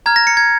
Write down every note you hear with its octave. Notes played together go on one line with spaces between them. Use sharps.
A#5 F6 G#6
A#6
C#7
G#6